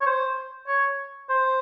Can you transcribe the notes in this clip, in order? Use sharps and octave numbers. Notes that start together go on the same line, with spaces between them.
C#5
C5
C#5
C5